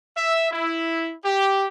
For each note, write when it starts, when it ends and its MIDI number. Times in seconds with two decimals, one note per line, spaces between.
0.16 0.51 76
0.51 1.13 64
1.24 1.66 67